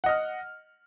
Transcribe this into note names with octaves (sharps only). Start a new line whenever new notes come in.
D#5 F#5 F6